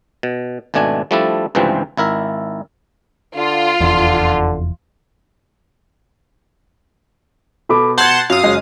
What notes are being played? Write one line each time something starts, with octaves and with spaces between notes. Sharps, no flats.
B2
G#1 B2 A3 D4 G#5
F3 G3 A3 D4 E4 A4
C#2 G2 C3 E3 F3 C4
G#1 E4 A#4 E5
D3 F4
F1 E2 D3
B2 A4 B5 D6
F#5 A5 C6 G6 G#6
F#2 F#3 F5 D#6
F#1 F#3 G#3